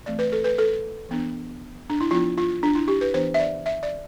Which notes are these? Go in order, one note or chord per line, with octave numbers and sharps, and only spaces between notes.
E3 A3 C4 D5
B4
A4
B4
A4
E3 B3 D4
D4
E4
F3 B3 D4 F4
F4
D4
E4
G4
B4
E3 B3 D4 C5
E5
D5
E5
D5